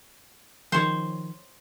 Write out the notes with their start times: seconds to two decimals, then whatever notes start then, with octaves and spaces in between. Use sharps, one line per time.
0.72 D#3 F3 C5 C#5